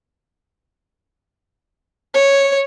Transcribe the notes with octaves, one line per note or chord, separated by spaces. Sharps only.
C#5